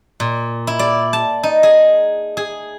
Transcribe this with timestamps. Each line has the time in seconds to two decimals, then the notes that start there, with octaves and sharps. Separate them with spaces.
0.20 A#2
0.67 E4
0.79 D5
1.13 A5
1.43 D#4
1.63 G#4
2.37 G#4